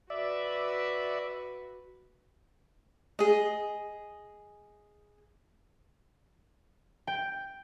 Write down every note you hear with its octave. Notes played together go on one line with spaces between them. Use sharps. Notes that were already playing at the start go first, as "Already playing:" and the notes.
F#4 B4 D5 E5
G#4 D#5
G5